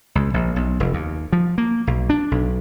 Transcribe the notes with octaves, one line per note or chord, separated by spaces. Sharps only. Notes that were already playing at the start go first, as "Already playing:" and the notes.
C#2
A#1
B1
F1
D#2
F3
A#3
B1
D4
B1